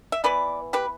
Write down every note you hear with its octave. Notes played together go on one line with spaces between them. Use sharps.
E5
E3 B3 B4 D5
G4 B4